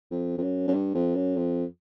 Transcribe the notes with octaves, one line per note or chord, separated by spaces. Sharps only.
F2
F2
F#2
F#2
G2
F2
F#2
F2